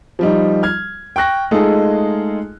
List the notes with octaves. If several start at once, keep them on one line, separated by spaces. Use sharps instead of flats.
F3 G3 D#4
F6 G#6
G5 C#6 F#6 A#6
G#3 A3 D#4 F4 G#4 A4